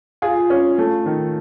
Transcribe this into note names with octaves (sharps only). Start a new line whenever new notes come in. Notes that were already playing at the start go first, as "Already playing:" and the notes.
F4 G#4
C#4
A3
D#3